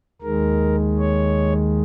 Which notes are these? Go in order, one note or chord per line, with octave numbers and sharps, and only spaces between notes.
D#2 D#3 G#3 A#4
C#5